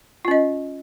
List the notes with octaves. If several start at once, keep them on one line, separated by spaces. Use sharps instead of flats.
C#4 F4 D#5